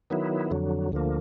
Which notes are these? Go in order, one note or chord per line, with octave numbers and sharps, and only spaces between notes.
D#3 F#3 B3 E4
F2 D3 F#3
D2 D3 F3 A#3